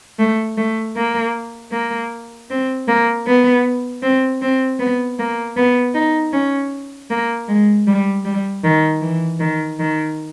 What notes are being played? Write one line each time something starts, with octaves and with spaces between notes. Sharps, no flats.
A3
A3
A#3
A#3
C4
A#3
B3
C4
C4
B3
A#3
B3
D#4
C#4
A#3
G#3
G3
G3
D#3
E3
D#3
D#3